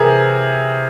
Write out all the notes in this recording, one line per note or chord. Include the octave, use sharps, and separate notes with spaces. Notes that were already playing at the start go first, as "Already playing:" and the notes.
Already playing: C3 E3 G#4 A#4